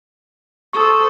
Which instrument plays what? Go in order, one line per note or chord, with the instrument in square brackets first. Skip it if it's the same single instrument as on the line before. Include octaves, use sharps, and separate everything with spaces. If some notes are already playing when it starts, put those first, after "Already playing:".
[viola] A4 C5 [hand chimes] C#6 D#6